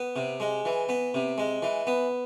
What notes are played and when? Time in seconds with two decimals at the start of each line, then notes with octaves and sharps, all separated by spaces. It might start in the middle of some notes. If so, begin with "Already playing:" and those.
Already playing: B3
0.16 C3
0.40 G#3
0.65 E3
0.89 B3
1.14 C3
1.38 G#3
1.62 E3
1.87 B3